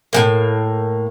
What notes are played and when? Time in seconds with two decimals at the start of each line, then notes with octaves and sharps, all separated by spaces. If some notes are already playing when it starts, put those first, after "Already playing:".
0.13 A2 G#3 A#3